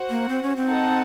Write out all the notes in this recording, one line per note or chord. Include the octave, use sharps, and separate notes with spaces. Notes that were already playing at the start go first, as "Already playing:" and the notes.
Already playing: F#4 C5 F#5
A#3
C4
C#4
C4
D#4 A4 D#5 F#5 A5